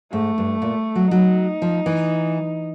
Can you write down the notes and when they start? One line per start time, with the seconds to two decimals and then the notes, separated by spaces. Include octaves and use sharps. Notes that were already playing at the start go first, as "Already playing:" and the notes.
0.12 G#2 A3
0.38 G2
0.62 A#2
0.95 F#3
1.11 F#3 D#4
1.62 F3
1.86 E3